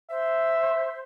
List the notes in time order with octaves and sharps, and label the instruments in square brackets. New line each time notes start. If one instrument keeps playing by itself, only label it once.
[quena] C5 [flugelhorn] E5